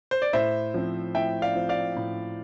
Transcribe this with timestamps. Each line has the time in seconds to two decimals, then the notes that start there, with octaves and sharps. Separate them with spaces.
0.11 C5
0.22 D5
0.33 A2 C5 E5
0.74 F3 C4
1.15 A2 E5 G5
1.42 D5 F5
1.56 F3 C4
1.69 D5 F5
1.96 A2